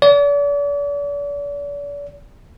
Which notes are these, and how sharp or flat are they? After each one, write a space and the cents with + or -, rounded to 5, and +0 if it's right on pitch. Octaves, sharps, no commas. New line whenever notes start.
D5 -40